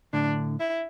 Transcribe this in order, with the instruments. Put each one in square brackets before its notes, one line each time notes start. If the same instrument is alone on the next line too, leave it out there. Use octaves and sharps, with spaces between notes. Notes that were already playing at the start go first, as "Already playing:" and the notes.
[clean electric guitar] A2 D3 [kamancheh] D4
[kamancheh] E4